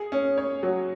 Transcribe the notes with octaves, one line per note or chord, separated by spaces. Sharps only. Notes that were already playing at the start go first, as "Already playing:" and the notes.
Already playing: G#4
C#4
C#5
F#3